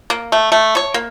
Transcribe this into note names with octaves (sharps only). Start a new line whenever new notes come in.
A#3
A3
A3
C#5
A#3